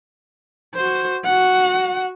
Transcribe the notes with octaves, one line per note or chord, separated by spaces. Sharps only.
F#4 C5
F#4 F#5